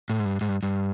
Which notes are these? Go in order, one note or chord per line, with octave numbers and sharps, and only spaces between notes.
A2
G#2
G2
G#2
G2
G2